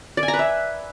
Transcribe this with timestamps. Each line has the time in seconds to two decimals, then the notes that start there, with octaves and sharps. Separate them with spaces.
0.17 D5
0.23 G#5
0.28 A#5
0.34 B4
0.39 E5